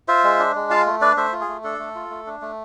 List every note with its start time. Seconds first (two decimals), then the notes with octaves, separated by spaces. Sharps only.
0.08 F4 C5 E5
0.24 G#3
0.39 D4
0.55 G#3
0.70 F4 F5 A5
0.86 A3
1.01 D4 B4 D5
1.17 A3 C5 E5
1.33 F4
1.41 G#4
1.49 A3
1.64 D4 A4
1.79 A3
1.95 F4
2.10 A3
2.27 D4
2.42 A3